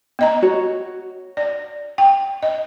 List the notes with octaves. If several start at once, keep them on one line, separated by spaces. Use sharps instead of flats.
B3 D#5 A#5
F#4 C#5
D5
G5
D#5